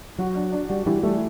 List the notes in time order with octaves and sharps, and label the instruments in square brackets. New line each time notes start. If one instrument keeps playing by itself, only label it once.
[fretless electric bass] F#3 [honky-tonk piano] F#4
[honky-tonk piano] D4
D4
[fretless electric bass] G3 [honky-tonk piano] F#4
[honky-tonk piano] E3 [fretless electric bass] G3
[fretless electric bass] G3 [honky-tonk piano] A3